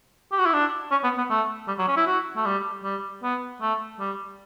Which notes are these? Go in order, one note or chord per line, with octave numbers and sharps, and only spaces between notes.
G4
F#4
E4
D4
C#4
B3
B3
A3
G3
F#3
C#4
E4
F#4
A3
G3
G3
B3
A3
G3